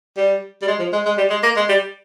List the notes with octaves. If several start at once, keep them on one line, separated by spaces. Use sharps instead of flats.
G3
G3
G#3
F3
G#3
G#3
G3
G#3
A#3
G#3
G3